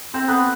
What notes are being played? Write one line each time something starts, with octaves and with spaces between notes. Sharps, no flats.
C4 C5
B3 B4